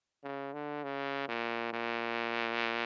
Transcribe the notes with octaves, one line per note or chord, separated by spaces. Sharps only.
C#3
D3
C#3
A#2
A#2